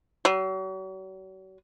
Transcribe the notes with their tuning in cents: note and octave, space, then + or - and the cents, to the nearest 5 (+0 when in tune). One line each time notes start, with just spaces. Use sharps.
F#3 +40